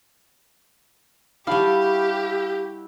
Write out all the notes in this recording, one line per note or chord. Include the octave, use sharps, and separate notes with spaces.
G3 D4 E4 F#4 G4 E5 F5